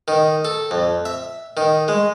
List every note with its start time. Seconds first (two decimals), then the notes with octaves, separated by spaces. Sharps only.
0.08 D#3
0.45 A4
0.71 F2
1.05 E5
1.57 D#3
1.88 G#3